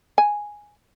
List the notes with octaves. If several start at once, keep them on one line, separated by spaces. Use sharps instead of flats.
G#5